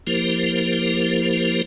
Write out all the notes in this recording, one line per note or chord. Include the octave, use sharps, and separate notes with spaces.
F3 A#3 E4 G4 A#4 C5